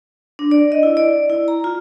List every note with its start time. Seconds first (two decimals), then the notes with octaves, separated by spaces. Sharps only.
0.39 D4
0.51 D5
0.72 D#5
0.83 E4
0.97 D5
1.30 E4
1.48 A#5
1.64 F4